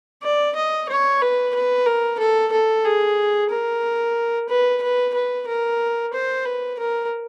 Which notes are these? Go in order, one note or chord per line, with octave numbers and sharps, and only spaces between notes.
D5
D#5
C#5
B4
B4
A#4
A4
A4
G#4
A#4
B4
B4
B4
A#4
C5
B4
A#4